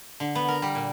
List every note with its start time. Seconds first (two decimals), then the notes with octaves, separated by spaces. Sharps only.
0.20 D3
0.35 B3
0.48 A#4
0.62 G3
0.75 A#2